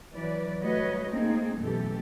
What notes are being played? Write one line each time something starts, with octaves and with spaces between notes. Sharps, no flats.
E3 F#3 B4 D5
G3 A3 F#4 B4 C#5 D#5
A3 A#3 C4 D#4 G#4
F#2 B2 E3 A3 G4 A4